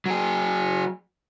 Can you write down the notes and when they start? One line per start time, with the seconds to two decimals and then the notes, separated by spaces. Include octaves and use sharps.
0.06 F#3 G#4